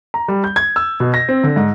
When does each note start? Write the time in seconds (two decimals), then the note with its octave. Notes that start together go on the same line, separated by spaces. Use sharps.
0.14 A#5
0.28 G3
0.44 G6
0.56 G#6
0.76 E6
1.00 B2
1.14 A#6
1.29 C4
1.44 D3
1.56 G#2